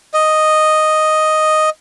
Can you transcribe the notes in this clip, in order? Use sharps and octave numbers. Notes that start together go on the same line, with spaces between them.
D#5